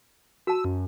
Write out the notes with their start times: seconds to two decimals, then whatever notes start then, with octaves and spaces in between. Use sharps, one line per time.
0.47 F#4 A5 E6
0.65 F#2